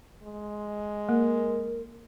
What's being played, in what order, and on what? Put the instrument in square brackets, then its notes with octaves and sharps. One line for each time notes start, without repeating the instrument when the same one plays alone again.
[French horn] G#3
[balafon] A#3 [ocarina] A#4